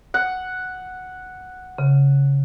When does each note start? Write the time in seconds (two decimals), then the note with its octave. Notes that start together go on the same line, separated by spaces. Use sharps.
0.14 F#5
1.78 C#3